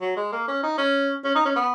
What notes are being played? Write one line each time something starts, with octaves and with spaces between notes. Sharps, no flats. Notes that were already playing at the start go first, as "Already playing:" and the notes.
F#3
G#3
A#3
C#4
D#4
C#4
C#4
D#4
C#4
B3